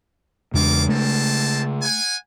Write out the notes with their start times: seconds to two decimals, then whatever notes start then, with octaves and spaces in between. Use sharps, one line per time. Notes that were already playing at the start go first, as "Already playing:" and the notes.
0.54 E2 C#3 G#3 A#3 D4 F4 D6
0.89 A3 A#3 C4 A5
1.82 F#5 G#5